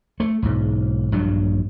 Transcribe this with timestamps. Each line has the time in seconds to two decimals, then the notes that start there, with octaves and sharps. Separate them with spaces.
0.20 A3
0.43 B1 G#2
1.12 A#1 G2 F#3